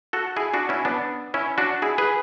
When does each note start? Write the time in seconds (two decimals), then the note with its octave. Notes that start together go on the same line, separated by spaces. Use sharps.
0.13 F#4 A4
0.36 E4 G#4
0.54 D4 F#4
0.69 C#4 E4
0.85 B3 D4
1.34 C#4 E4
1.58 D4 F#4
1.82 E4 G#4
1.98 G#4 B4